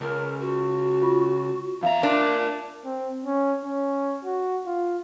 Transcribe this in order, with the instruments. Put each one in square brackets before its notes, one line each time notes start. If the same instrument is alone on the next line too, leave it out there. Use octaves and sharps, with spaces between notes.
[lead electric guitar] C#2 [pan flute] A#4
[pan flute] F#4
[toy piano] F4
[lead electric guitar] E2 A#5 [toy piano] E5 F5
[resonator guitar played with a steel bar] D4 [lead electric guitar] A#4 D5
[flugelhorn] C4
C#4
C#4
F#4
F4